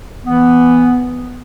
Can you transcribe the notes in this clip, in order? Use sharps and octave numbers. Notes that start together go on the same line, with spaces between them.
E3 B3